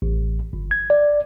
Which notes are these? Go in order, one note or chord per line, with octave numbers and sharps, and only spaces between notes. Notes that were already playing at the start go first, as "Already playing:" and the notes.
A1
G1
G#6
D5